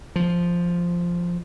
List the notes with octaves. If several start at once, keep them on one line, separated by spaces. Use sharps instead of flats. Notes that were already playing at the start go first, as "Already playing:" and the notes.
F3